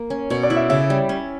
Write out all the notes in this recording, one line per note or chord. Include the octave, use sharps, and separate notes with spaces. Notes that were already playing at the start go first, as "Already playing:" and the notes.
Already playing: A#3
C#4
B2 C#5
D5
E4
E5
C#3 E5
G3
C#4